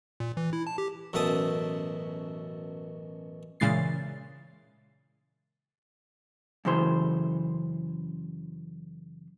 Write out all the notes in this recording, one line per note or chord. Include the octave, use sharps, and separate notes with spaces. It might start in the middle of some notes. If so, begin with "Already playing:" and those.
A#2
E3
E4
A5
G4
A1 F#2 B2 E5 A5 D#6
A#2 C#3 E3 G#3 A6 C7
F#2 C#3 E3 C5